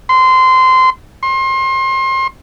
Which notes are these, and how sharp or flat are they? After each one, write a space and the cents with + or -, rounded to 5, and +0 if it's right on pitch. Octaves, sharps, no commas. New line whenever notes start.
C6 -20
C6 +30